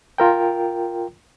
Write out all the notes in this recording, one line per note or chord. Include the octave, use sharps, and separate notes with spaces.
F4 A#4 G5